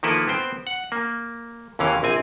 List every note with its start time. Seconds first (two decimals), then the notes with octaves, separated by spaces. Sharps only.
0.03 D#3 F3 A#3 E4 A4 B4
0.27 B3 C4 C5 G5
0.67 F#5
0.92 A#3
1.79 D#2 C3 E3 C#4 F5
2.03 A#1 C4 G#5